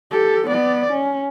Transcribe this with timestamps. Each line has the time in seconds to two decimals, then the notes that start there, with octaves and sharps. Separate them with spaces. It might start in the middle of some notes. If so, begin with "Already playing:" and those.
0.11 G4 A4
0.47 B3 D5
0.92 C#4